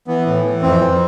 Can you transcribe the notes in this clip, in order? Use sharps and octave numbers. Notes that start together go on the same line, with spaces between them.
E3 B3
A2
E3
F2 C4
F2